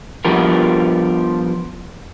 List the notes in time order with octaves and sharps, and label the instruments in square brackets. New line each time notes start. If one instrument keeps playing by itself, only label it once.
[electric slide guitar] F3 G3 B3 D4 A#4